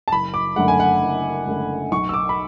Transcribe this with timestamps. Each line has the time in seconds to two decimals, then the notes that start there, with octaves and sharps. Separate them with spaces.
0.08 A5
0.12 F#1 B5
0.34 D6
0.56 F#2 D3 A3 F#5
0.68 G#5
0.80 F#5
1.02 F#1
1.47 F#2 D3 A3
1.91 B1 C#6
2.09 E6
2.14 D6
2.29 B5